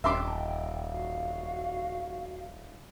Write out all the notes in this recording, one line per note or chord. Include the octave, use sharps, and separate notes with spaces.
D#1 D#5 E5 G5 C6 D6
F#4 F5